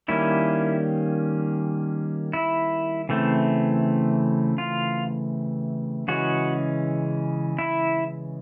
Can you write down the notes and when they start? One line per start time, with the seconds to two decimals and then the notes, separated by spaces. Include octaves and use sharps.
0.08 D#3 G3 A#3 C#4 E4
2.33 E4
3.09 C#3 E3 A3 C4
4.58 F4
6.08 C#3 E3 G#3 C#4 F#4
7.59 E4